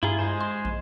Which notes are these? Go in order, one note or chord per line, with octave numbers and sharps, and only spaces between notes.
G2 E4 F4 G#4 A#5
G#3 G#4 C5
C6
A#1